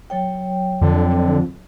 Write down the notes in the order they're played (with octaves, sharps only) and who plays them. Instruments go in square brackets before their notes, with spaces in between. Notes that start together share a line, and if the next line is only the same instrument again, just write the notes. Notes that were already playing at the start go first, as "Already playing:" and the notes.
[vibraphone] F#3 C#5 G5
[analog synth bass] F2 [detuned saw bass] D3